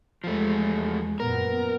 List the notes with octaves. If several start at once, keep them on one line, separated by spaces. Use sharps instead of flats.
E2 F3 G#3 A3
F#2 A#2 B3 A#4